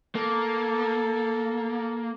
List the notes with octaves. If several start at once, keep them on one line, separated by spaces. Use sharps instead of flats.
A#3 A4